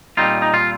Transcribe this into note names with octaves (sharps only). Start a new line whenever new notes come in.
A#2 G3 C4 D#4 F4
D#4
F4